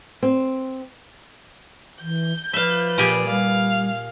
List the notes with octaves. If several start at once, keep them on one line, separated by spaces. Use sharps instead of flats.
C4
E3 G6
F3 B4 D5 E5 F5
A#2 G4 G#4
G3 F5